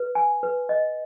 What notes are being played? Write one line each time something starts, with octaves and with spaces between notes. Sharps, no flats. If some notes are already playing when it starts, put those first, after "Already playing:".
Already playing: B4
G#5
B4
D#5